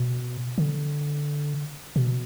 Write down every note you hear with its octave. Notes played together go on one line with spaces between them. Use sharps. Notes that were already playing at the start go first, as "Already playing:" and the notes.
Already playing: B2
D3
B2